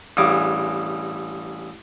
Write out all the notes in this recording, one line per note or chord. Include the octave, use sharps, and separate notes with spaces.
A1 G2 G#4 D6